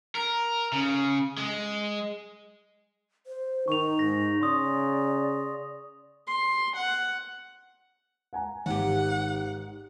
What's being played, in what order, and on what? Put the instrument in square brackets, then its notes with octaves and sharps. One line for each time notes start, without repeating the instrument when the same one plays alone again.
[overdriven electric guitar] A#4
C#3
G#3
[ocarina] C5
[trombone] D#3 [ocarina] D#4 [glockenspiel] C#6 F7
[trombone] G#2 [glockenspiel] A#6
[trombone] C#3 [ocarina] D5 [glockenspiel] C6 C#6 D#6
[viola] C6
F#5
[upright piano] F#5 G#5 A#5
[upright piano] G#1 [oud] G#2 G4 [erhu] F#5